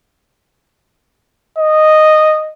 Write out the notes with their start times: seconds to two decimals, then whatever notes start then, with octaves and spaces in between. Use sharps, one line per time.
1.58 D#5